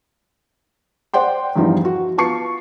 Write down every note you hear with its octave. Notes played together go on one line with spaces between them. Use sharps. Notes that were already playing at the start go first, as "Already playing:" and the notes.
C5 D5 F#5 G5 C6
E2 G2 E3 F3 G3 D#4
F#4
B3 F4 A5 C#6 C7 C#7